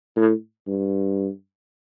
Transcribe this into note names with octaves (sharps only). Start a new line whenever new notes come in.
A2
G2